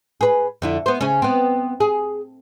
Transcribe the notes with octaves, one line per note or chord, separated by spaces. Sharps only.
G#4 B4
F2 D3 E4
B3 C5
C#3 C#4
B3 C4
G#4